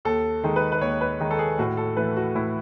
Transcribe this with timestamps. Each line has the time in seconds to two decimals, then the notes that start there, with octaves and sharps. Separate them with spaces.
0.05 D#2 A4
0.44 D#3 G#3 D#4
0.56 B4
0.72 B4
0.81 D#2 C#5
1.01 B4
1.20 D#3 G#3 D#4
1.31 A4
1.39 G#4
1.59 A2 F#4
1.77 A4
1.96 E3 A3 B4
2.17 F#4
2.35 A2 E4